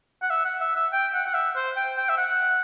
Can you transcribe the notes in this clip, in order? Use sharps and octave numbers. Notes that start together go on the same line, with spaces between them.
F#5
E5
F#5
E5
E5
G5
F#5
F#5
E5
C5
G5
G5
E5
F#5